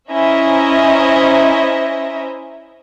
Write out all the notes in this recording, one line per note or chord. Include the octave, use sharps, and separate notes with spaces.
C#4 E4 C5 D#5 E5 A#5